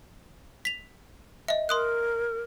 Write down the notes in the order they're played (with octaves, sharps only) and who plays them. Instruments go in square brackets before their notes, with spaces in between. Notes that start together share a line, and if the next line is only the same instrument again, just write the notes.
[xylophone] B6 F7
D#5 E5
[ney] A#4 [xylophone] C6 D#6 F#6